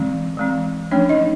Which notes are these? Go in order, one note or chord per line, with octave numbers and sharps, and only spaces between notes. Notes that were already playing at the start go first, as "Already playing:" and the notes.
Already playing: E3 G#3 C4
E3 G#3 C4
F3 A3 C#4 D4 C#5
D#4 D#5